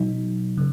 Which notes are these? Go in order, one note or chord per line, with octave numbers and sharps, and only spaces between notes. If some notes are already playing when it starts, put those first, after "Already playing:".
Already playing: B2 F#3 D#4
C#3